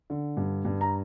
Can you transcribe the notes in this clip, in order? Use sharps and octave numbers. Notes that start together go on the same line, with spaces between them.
D3
G2
G2
A#5